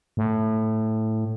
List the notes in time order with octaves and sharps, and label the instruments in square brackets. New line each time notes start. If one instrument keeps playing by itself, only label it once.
[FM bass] A2